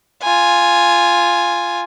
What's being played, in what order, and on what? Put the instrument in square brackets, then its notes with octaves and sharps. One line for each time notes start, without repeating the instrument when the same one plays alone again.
[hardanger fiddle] F4 G#5